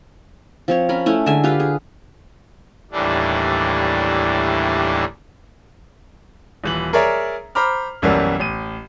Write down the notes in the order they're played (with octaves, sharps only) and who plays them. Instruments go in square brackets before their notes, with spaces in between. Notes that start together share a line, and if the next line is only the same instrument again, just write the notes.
[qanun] F3 C4 C#5
C#4 A#4 B5
A3 C#4 E4
D3 G#3 E5 G#5
F4 G4 B4 F5
G#4
[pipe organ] D#2 A2 E3 G3 D4
[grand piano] D#1 E3 F#7
G#4 A#4 C#5 D5 E5 A#5
C5 A#5 B5 D6 F6
B1 F#2 E3 F#3 G3 A#3
A1 D#7